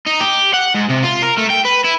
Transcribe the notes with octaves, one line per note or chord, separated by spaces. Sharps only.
D#4
G4
F#5
G#2
C3
F4
A#4
A3
G5
B4
E4